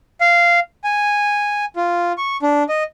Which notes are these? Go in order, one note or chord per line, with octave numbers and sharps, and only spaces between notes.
F5
G#5
F4
C#6
D4
D#5